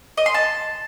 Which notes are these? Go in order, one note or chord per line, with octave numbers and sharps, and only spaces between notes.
D#5
C6
A5